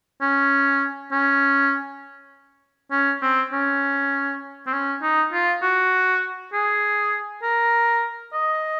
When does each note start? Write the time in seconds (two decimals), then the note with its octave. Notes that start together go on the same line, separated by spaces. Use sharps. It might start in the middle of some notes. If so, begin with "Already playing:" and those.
0.21 C#4
1.12 C#4
2.91 C#4
3.22 C4
3.53 C#4
4.67 C4
4.73 C#4
5.02 D#4
5.33 F4
5.62 F#4
6.53 G#4
7.43 A#4
8.33 D#5